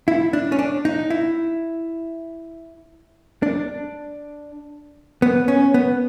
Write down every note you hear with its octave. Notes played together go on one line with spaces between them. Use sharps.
E4
D4
C#4
D4
D#4
E4
D4
B3
C#4
B3